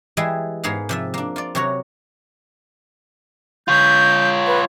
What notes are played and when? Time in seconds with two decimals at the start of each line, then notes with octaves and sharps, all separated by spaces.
0.17 E3 G3 G#3 E4 G#4
0.64 G#2 B3 G#4 A#4 F5
0.89 C3 F3 E5
1.14 A#3 D4
1.36 F4 D5
1.55 C3 F#3 F#4 C#5 A#5
3.68 F4 C#5 G6
4.47 B4